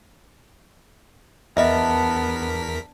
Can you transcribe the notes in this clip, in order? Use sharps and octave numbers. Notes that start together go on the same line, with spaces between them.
E2 B3 D4 A#4 D#5 E5 B6